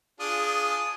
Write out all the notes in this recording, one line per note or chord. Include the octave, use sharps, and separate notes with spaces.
D4 F4 G#4 D#6